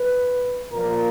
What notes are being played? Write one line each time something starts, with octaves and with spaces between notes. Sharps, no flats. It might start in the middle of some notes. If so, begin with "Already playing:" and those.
Already playing: B4
A#2 F3 A#3 A#4